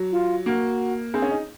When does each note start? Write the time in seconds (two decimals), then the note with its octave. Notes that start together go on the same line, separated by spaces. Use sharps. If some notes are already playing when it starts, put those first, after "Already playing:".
Already playing: F#3
0.12 F4
0.46 A#3 F#4
1.14 C4 G#4
1.22 C#4
1.31 D#4